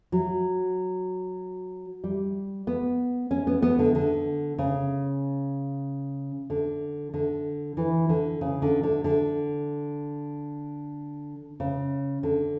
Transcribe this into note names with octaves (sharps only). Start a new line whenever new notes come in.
F#3
G3
B3
C#4
B3
B3
D3
D3
C#3
D3
D3
E3
D3
C#3
D3
D3
D3
C#3
D3